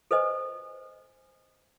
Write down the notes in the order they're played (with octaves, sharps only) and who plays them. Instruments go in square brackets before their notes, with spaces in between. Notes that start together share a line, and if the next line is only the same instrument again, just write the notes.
[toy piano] A4 B4 C5 D#5 G#5